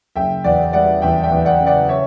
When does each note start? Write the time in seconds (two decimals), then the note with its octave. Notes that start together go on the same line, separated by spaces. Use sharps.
0.16 F#1 E5 G5
0.44 E2 D5 F#5
0.73 G3 D5 F#5
1.02 E2 E5 G5
1.23 E5 G5
1.32 E2
1.45 D5 F#5
1.60 C#3
1.67 D5 F#5
1.89 C#5 E5